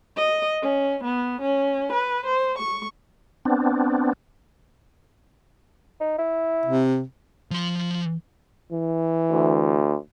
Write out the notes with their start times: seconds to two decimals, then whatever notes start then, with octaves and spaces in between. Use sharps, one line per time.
0.17 D#5
0.62 C#4
1.04 B3
1.41 C#4
1.93 B4
2.26 C5
2.58 C#6
3.45 B3 C4 D4
6.00 D#4
6.18 E4
6.65 C3
7.51 F3 C6
8.72 E3
9.31 D2